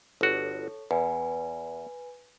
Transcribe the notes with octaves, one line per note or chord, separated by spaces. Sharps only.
G1 F#4 A4 C#5
E2 B4 G#5